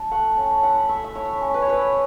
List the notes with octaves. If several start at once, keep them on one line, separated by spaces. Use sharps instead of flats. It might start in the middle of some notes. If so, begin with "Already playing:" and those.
Already playing: A5
A3 F#5
C#4 A5
E4 F#5
A3 E5
E5
E4 C#5
C#4
B4
C#5
E4 B4